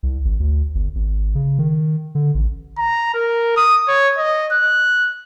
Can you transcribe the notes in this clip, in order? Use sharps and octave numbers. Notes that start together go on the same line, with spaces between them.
C2
G#1
D2
G1
G#1
C#3
D#3
D3
A1
A#5
A#4
D#6
C#5
D#5
F#6